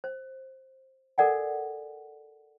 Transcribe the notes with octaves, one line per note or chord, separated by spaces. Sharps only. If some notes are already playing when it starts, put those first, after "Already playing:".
C5
A4 A#4 D5 F#5 G#5